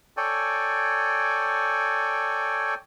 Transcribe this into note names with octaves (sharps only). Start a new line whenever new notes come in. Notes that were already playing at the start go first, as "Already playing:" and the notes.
A4 C#5 D5 G5 G#5